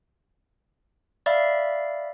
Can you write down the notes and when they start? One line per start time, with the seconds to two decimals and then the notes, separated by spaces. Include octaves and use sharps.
1.26 D5 E5 F5 B5